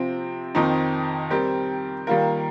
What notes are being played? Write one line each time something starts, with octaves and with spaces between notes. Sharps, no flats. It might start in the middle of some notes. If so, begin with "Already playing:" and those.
Already playing: C3 F3 C4
F2 D#3 C4 D#4
G3 C4 G4 A#4
D#3 G3 A#3 F4 A#4